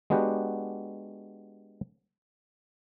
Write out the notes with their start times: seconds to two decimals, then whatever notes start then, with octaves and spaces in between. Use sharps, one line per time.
0.10 G#3 B3 D4 F#4 G4 F#5